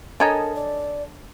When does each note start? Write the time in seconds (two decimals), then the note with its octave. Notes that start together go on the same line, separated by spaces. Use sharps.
0.20 D4 A4 A#4 C#5 D#5 G#5 A#5
0.55 D5